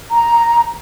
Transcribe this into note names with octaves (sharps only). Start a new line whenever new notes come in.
A#5